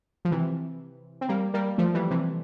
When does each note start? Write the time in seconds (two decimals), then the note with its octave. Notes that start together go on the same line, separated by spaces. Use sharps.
0.25 F3
0.31 C3 E3
1.21 C4
1.29 G3 A#3
1.54 G3 A#3
1.78 F3 A3
1.94 E3 G3
2.11 C3 E3